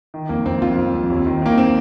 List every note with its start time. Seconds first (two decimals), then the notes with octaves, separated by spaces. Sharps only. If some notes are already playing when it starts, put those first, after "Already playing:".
0.14 D#3
0.29 F2 A#3
0.45 F2 C4
0.61 F2 F4
0.77 F2
0.94 F2
1.10 D#2
1.26 D#3
1.42 D#3 A#3
1.58 C4